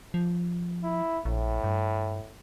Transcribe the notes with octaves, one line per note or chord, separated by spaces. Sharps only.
F3
E4
A#1 A2
G2